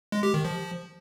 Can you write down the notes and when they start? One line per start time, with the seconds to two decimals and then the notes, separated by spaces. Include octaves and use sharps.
0.12 G#3
0.23 G4
0.34 D#3
0.45 F3